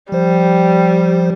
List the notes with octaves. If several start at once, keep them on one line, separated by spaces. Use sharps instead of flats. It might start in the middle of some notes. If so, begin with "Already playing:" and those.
F3 G3 C5